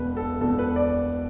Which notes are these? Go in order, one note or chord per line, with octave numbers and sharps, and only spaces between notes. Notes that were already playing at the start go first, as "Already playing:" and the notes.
Already playing: E1 E2 B2 B4
A4
E1 E2 B2 A4
B4
D5